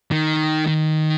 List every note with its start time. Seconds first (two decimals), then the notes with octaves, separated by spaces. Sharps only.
0.11 D#3
0.67 D#3